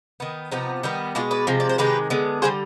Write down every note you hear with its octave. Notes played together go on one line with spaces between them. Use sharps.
D#3 B3
C3 F3 B3 D#4
D#3 G3 B3
B2 G#3 B3 D4 F4
B4 D5
C3 F3 G#3
D5
C5
C3 D#3 G#3 G4 B4
D3 G#3 B3
D3 G3 B3 G#4 C5